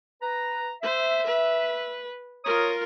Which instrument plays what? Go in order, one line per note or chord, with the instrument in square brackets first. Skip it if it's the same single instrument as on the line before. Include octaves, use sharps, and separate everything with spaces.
[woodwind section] B4 A#5
[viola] C5 [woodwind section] E5
[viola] B4
[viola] F4 A#4 [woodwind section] C#5 A#5 D#6